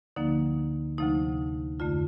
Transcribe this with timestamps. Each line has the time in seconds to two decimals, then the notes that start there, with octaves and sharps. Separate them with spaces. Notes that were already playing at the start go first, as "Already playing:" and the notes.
0.16 D2 D3 F3 A#3 D#4
0.98 D2 C3 F3 A3 D#4
1.80 F2 D3 A3 F4